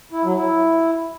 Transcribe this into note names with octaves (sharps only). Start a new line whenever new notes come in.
E4
F#3
E4